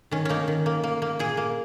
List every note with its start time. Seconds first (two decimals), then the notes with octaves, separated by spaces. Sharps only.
0.11 D#3 C#4
0.25 A#3 C#4 D#4
0.48 D#3
0.66 A#3
0.84 A#3
1.02 A#3
1.19 A#2 G#4
1.37 A#3